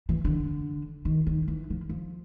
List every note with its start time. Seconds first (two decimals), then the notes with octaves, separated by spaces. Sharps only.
0.09 E3
0.25 D3
1.05 D#3
1.27 D#3
1.48 E3
1.70 F3
1.89 F3